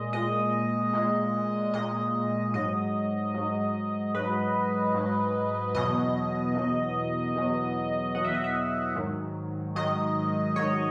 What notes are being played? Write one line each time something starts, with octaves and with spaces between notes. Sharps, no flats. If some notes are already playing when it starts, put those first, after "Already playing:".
Already playing: A#2 G#3 D#5
A#2 G#3 D#5
A#2 G#3
A#2 G#3 D#5
G#2 F#3 D#5
G#2 F#3
G#2 F#3 B4
G#2 F#3
E2 B2 F#3 D#5
E2 B2 F#3
E2 B2 F#3
E2 B2 F#3 F#5
E5
D#5
E5
G#2 D#3 F#3
G#2 D#3 F#3 D#5
G#2 D#3 F#3 C#5